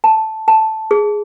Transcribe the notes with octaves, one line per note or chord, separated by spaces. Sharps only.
A5
A5
G#4